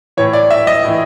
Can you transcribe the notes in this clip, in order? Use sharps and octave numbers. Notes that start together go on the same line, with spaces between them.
A2 E3 C#5
D5
E5
D#5
A2 E3